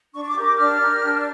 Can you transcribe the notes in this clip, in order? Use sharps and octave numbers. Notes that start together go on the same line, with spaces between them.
D4 C#6
C#6
D6
G4 A#4
D6
D4 F6
G4 A#4
D4